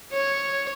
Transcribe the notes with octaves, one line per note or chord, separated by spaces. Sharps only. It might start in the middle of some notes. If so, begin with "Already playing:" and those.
C#5